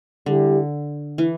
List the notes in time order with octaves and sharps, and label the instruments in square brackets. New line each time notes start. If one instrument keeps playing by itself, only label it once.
[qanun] D3 [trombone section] G3 E4 G4
[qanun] E3